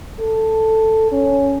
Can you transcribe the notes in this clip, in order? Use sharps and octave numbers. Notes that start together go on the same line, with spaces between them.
A4
C#4